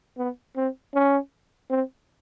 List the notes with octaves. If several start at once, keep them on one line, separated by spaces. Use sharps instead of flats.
B3
C4
C#4
C4